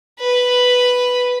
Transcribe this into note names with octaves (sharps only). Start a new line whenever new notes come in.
B4